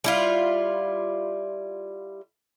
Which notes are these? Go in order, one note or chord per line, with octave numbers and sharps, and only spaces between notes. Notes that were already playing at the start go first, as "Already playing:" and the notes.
G3 E4 F4